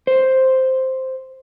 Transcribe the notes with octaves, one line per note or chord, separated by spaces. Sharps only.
C5